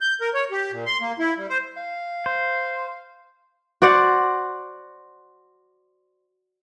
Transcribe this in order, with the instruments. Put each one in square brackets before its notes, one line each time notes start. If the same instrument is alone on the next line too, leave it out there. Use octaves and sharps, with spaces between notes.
[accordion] G6
A#4
C#5
G4
A#2
C6
A#3
E4
G3
C5
[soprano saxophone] F5
[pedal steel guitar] C5
[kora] F#4 C5 D5 F#5